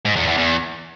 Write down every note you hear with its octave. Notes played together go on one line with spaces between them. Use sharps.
G#2
E2
E2
E2